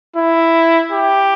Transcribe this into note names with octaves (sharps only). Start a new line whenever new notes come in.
E4
G4